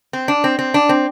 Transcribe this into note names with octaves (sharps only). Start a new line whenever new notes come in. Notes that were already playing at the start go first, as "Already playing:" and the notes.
C4
D4
C4
C4
D4
C4